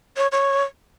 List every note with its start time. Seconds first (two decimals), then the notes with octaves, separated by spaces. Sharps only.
0.17 C#5
0.32 C#5